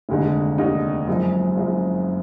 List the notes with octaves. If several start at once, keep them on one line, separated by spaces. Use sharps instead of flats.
F1 D#2 D3 G#3 D#4
F1 D#2 D3 G#3 D#4
F#1 F#2 F3 G#3
F#1 F#2 F3 G#3